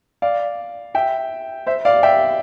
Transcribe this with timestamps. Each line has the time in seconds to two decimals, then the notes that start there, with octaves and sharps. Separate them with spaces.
0.22 D5 F5
0.95 E5 G5
1.67 C5 E5
1.85 D5 F5
2.03 E5 G5